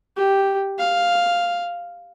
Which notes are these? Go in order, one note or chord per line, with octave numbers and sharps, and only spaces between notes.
G4
F5